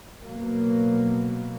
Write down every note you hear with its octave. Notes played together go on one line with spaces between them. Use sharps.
B2 F#3 A#3